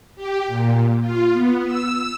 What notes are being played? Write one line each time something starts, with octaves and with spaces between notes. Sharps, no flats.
G4
A#2
F4
B3
E6